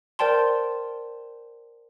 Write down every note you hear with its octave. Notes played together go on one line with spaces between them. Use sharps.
A#4 C5 D5 G5 A5 C6